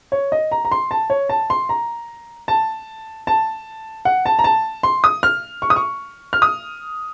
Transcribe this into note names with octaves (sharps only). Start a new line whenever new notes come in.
C#5
D#5
A#5
A#5
C6
A5
C#5
A5
C6
A#5
A5
A5
F#5
A5
A#5
A5
C6
D#6
F6
C#6
D#6
C#6
F6
D#6